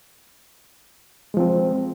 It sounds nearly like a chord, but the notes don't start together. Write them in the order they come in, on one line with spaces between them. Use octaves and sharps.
G#3 F3 C4